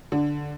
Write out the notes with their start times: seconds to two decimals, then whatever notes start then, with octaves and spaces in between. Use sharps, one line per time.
0.12 D3